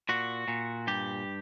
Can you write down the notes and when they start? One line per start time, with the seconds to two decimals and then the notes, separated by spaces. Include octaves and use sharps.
0.09 A#2 F#4
0.48 A#2
0.87 G2 G4